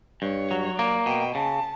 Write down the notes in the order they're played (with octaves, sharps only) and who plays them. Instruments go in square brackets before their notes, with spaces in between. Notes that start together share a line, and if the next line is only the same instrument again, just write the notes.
[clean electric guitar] G2 [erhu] C#5
[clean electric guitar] F#3
[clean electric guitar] A#3 [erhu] D5
[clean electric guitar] B2 [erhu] G5
[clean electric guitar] C#3 [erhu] A5